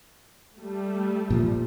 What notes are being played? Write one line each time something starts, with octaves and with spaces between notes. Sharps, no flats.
G3 A3
A#2 F3